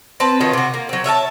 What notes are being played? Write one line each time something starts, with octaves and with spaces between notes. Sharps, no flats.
C4 B4 A5
D#3 F#3 B3 F4
C3 F#4
A#3
F#3 C4
C#5 E5 F5 A5